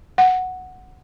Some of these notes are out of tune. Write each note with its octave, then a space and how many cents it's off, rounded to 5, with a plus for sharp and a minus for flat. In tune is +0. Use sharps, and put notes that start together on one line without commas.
F#5 -5